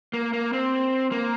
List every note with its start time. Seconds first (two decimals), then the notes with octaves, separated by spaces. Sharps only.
0.13 A#3
0.33 A#3
0.53 C4
1.12 A#3